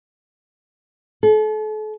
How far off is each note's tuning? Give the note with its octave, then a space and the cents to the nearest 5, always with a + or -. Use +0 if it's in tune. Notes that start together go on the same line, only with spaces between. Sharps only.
A4 -40